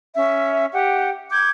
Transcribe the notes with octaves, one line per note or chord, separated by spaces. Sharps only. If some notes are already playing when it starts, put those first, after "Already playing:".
C#4 E5
G4 F#5
D6 G6 G#6